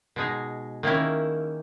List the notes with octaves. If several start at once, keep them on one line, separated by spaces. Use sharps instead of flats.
B2 G#3 D#4 G#4
D#3 A#3 C#4 E4